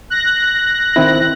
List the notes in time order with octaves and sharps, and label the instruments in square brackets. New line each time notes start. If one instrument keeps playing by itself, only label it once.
[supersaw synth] F#6 A#6
[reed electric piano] D#3 C4 E4